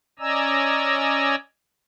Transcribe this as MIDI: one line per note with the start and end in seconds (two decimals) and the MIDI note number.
0.19 1.35 61
0.19 1.35 74
0.19 1.35 75
0.19 1.35 80
0.19 1.35 82
0.19 1.35 88